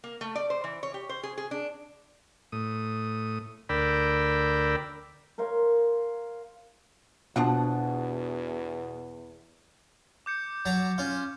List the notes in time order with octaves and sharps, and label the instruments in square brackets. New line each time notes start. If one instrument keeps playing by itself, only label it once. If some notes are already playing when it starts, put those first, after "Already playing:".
[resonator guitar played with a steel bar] A#3
A3
D5
C5
E3
C#5
G4
C5
G#4
G#4
D4
[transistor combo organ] A2 D#6
D2 A#4 D5 G5 B5 E6
[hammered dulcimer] A#4 C5 C#5 F5
[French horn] E2 [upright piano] B2 [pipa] F3 D4 F#5
[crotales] D6 G6 C#7
[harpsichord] F#3 A5 A#5
C#4 F4